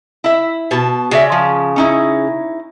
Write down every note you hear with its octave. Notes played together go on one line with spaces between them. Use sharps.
E4 E5
B2 A5
C#3 F#4 D5 E5
F3
C#4 D#4 E4